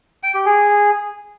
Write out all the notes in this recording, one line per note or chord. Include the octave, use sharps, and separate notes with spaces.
G5
G4
G#4